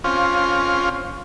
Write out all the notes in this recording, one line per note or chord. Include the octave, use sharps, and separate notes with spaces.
C4 C#4 F4